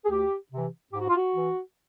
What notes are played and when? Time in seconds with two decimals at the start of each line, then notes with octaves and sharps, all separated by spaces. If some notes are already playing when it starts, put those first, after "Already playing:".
0.05 G#4
0.10 D2 G4
0.52 C3 E3
0.93 G#2 G4
1.00 F#4
1.09 F4
1.16 F#4
1.35 E3